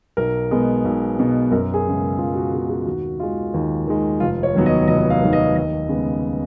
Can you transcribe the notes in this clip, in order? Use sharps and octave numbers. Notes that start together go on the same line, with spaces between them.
B1 A#4
B2 G#3 B3
B1
B2 G#3 B3
F#2 A#4
G#4
C#3 G#3 B3
F#2 F4
F#4
C#3 G#3 B3 G#4
G#4
D#2 F#4
D#3 G#3 F4
D#2
D#3 G#3
F1 F4
C#5
D#2 D#3 F#3 B3
D#5
F1 D#5
F5
D#2 D#3 F#3 B3
D#5
D#2 D#5
C#3 G#3 B3